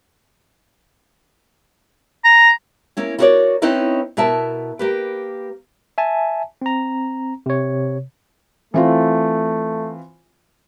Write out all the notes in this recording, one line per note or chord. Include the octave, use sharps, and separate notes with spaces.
A#5
A#3 C#4 E4
E4 F#4 A#4 B4 C#5 D5
C4 C#4 D#4 E4 B4 D#5
B2 E4 A#4 E5 A5
A#3 G4 B4
E5 G#5 A5
C4 A#5
C3 C#5
E3 A3 C4 F4